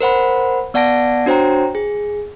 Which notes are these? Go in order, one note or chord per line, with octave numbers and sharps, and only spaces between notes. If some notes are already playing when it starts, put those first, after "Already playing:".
A#4 C5 F#5 B5
B3 D5 F#5 A5 A#6 D7
D4 F#4 C5 C#5 G5 A#5
G#4